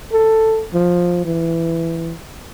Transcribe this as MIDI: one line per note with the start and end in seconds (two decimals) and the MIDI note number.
0.13 0.64 69
0.74 1.21 53
1.25 2.14 52